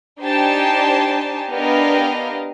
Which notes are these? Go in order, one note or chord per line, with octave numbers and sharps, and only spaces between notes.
D4 D#4 G4 C5 G#5 A5
B3 D4 G4 A#4 D#5 F5